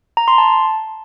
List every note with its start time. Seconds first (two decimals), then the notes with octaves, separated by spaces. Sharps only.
0.17 A#5
0.28 C6
0.38 A5